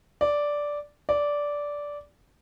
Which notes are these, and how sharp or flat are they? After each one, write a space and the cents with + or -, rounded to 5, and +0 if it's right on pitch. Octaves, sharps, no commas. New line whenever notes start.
D5 -5
D5 -10